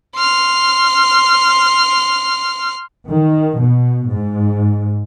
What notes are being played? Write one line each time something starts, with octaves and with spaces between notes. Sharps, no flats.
C6 F6
D#3
B2
G#2